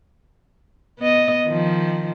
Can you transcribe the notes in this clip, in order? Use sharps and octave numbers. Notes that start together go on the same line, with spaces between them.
B3 D#5
D#3 F3